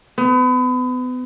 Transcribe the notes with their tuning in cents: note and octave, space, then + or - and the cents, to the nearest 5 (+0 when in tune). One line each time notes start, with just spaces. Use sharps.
B3 +35